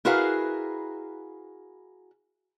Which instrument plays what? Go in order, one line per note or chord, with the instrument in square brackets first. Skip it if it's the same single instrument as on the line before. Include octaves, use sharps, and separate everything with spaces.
[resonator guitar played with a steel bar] E4 F#4 G#4 A#4 B4 F5